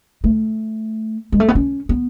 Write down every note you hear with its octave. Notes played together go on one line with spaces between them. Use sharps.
A3
G#3
A3
B3
C#4
B3